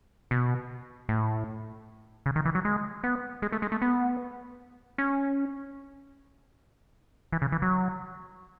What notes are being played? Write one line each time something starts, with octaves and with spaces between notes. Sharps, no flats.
B2
A2
C#3
D#3
E3
F#3
G#3
B3
G#3
A3
G#3
A3
B3
C#4
E3
C#3
E3
F#3